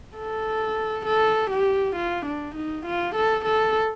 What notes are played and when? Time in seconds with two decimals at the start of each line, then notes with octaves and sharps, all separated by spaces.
0.17 A4
1.06 A4
1.51 G4
1.96 F4
2.26 D4
2.55 D#4
2.86 F4
3.15 A4
3.45 A4